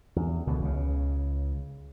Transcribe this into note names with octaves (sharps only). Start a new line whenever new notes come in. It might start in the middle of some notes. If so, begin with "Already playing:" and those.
E2
C#2 B2 D3
C#2 C#3